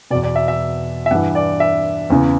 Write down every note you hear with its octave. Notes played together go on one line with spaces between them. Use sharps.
E2 B2 D5
D5
E5
E5
E5
G2 E3 F#5
D5
E5
E2 C#3 E3